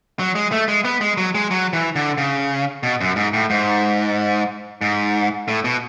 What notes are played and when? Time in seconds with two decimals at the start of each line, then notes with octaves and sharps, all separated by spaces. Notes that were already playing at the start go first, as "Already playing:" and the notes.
0.19 F#3
0.35 G#3
0.52 A3
0.68 G#3
0.85 B3
1.01 G#3
1.17 F#3
1.35 G#3
1.51 F#3
1.73 E3
1.96 D3
2.18 C#3
2.83 B2
3.01 F#2
3.16 G#2
3.33 A2
3.50 G#2
4.81 G#2
5.48 A2
5.64 B2